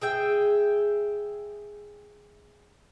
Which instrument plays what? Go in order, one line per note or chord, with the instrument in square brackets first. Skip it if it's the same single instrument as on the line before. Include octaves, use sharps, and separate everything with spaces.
[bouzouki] G#4 E5 G5